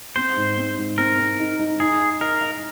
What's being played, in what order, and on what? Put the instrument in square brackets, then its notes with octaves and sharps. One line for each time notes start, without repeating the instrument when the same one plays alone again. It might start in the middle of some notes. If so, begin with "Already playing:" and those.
[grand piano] C4 [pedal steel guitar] C5
[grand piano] G#2
C4
G#2
[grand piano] C4 [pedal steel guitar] A#4
[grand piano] C4
D#4
D#4
[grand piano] D#4 [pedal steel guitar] G#4
[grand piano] D#5
[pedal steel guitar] A#4 [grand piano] D#5
[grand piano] D#5